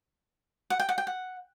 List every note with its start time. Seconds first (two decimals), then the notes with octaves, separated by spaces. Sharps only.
0.70 F#5
0.79 G5
0.89 F#5
0.98 G5
1.07 F#5